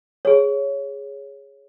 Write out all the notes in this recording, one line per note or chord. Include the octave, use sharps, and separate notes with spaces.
G#4 C#5